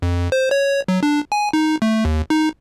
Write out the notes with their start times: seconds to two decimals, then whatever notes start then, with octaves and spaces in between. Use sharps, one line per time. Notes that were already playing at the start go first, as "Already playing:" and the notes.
0.02 F2
0.32 C5
0.51 C#5
0.88 F#3
1.03 D4
1.32 G#5
1.53 D#4
1.82 A3
2.05 D#2
2.30 D#4